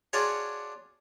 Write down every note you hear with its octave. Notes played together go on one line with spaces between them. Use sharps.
D4 F4 F#4 G#4 C#5